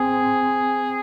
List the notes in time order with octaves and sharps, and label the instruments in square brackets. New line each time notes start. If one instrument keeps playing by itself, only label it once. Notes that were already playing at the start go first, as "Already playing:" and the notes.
Already playing: [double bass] C4 [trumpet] G#4